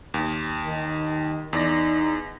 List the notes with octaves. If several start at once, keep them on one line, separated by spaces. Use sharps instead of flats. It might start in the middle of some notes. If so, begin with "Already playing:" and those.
D#2
D#3
E2 D#4 D5 A#6